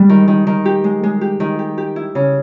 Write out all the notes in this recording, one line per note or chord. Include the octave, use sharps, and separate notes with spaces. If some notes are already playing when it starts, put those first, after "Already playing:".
Already playing: G3 G#3
D#3
D#3
D#3
G4
G#3
G#3
G4
D#3
G4
G4
E4
C#3